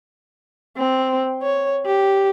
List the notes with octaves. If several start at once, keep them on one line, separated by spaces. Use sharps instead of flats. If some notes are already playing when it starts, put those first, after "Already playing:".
C4
C#5
G4